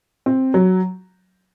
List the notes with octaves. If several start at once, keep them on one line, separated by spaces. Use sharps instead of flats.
C4
F#3